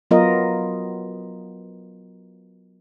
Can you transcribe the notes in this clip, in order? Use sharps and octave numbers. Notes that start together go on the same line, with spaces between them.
F#3 B3 F4 A#4 D#5